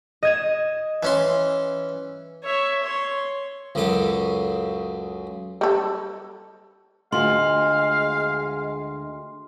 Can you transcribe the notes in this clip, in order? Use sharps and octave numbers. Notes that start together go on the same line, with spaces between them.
D#5 G#6 E7
E3 C#4 C6
C#5 E5
C#5 C6
C#2 F#2 C#3 A4 D6
G3 A4
D2 G#3 F4 F5 C6